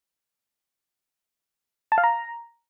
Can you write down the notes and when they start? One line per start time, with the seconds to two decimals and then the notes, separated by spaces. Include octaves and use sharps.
1.92 A5
1.98 F5
2.04 A#5